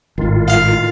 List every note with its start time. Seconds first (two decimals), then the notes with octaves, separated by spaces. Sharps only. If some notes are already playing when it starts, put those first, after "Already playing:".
0.18 G#1 A2 D#3 F4
0.48 F5